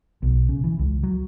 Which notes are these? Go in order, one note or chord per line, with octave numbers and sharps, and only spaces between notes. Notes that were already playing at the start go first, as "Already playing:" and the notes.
B1
C#3
E3
C#2
F#3